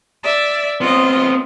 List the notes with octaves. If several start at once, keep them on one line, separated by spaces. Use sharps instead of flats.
D5 E5
B3 C4 F4 D#5